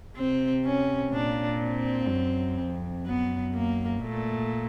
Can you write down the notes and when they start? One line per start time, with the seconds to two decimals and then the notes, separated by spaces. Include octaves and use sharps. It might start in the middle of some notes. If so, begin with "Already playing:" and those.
0.16 C3 C4
0.65 C#4
1.12 A#2 D4
1.61 C4
2.09 F#2
2.58 F2
3.06 F#2 B3
3.54 A#3
4.02 A#2 A3